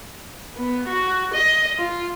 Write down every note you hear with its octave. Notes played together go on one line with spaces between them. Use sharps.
B3
F#4
D#5
F4